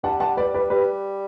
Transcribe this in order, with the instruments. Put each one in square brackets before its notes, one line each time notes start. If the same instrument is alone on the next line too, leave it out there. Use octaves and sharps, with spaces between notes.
[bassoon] G3 [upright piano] F#5 A5
[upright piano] F#5 A5
B4 D5
B4 D5
[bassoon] G3 [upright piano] G4 B4